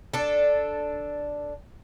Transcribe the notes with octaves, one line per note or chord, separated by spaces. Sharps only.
D4 A4